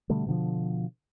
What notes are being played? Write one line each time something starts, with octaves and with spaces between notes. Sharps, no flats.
B2 D3 G3 A3
B2 D3 F3